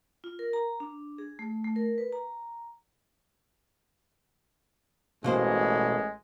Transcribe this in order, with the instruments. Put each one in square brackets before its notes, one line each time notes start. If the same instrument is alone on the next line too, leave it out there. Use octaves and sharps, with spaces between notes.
[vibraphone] F4
A#4
A#5
D4
G#4
A3
A3
A#4
B4
A#5
[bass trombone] A1 [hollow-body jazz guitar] B2 A#3 C5 [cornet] G#3